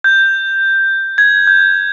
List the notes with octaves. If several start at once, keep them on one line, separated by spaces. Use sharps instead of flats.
G6
G#6
G6